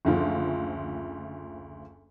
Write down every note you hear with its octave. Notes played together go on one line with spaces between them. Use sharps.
F#1 D2 F3